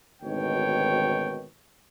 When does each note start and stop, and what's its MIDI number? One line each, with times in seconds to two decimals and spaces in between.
0.23 1.45 32
0.23 1.45 38
0.23 1.45 47
0.23 1.45 51
0.23 1.45 73
0.23 1.45 79